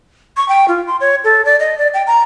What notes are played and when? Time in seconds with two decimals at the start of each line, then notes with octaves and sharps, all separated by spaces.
0.37 C#6
0.48 G5
0.68 F4
0.87 C6
1.01 C#5
1.24 A4
1.45 D5
1.60 D#5
1.78 D5
1.94 G5
2.07 A#5